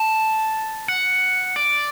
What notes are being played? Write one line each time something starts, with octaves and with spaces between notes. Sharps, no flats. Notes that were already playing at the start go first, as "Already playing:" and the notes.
Already playing: A5
F#5
D5